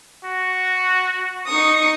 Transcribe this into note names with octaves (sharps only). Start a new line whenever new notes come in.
F#4
D#4 C#6 D#6